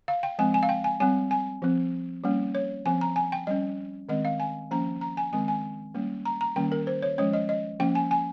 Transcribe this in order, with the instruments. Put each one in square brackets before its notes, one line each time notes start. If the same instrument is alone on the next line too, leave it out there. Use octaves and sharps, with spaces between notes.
[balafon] F5
G5
F3 G#3 C4 G#5
G#5
F5
G5
G#5
G3 C4 G#5
G#5
F3 C4
G3 A#3 C#4
C#5
F3 C4 G#5
A#5
G#5
G5
G3 C#4 D#5
D#3 G#3 C4 D#5
F5
G#5
F3 A#3 C#4 A#5
A#5
G#5
D#3 G#3 C4 G#5
G#5
G3 A#3 C#4
A#5
A#5
D#3 G3 A#3 C#4 G5
A#4
C5
C#5
F3 G#3 C#4 C#5
D#5
D#5
F3 A#3 C#4 G5
G#5
G#5